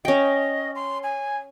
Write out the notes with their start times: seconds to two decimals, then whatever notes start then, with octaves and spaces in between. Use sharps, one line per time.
0.05 C#4 D#5 G5
0.75 C6
1.03 G#5